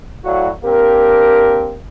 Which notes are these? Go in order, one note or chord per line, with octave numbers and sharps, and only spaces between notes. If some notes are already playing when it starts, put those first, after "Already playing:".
A2 F#3 E4 F#4 D5 F5
A#3 C4 D4 G4 A#4